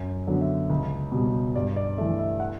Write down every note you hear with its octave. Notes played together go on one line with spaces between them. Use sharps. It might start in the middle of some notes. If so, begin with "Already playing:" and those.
Already playing: F#2
D3 F#3 B3 D4
E5
C#2
B2 G3
G2 D5
D5
E3 A3 E5
E5
F#5